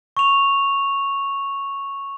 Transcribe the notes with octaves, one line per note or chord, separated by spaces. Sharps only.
C#6 F7